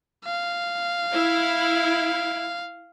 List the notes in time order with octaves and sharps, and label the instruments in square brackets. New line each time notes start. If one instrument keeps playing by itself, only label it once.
[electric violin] F5
[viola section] E4